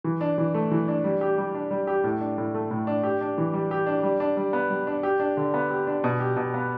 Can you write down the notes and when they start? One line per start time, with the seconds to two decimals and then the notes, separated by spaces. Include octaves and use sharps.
0.04 E3
0.21 D4
0.38 E3
0.54 A3
0.71 E3
0.88 D4
1.04 G3
1.21 G4
1.38 G3
1.55 D4
1.71 G3
1.87 G4
2.04 A2
2.20 D4
2.38 A2
2.54 A3
2.71 A2
2.87 D4
3.03 G4
3.21 D4
3.38 E3
3.53 G3
3.71 G4
3.86 D4
4.03 G3
4.20 D4
4.37 G3
4.53 B3
4.70 G3
4.87 D4
5.03 G4
5.20 D4
5.37 D3
5.54 B3
5.71 G4
5.87 D4
6.04 B2
6.20 G4
6.37 B2
6.54 B3